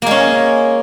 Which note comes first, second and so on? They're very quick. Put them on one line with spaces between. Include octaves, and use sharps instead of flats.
A#3 G#3 C#4